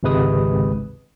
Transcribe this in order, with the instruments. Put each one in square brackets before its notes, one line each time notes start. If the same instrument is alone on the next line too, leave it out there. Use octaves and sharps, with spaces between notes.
[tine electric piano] G#1 C#2 C3 G#3 B4 D#6